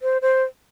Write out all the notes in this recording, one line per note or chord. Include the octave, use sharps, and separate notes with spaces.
C5
C5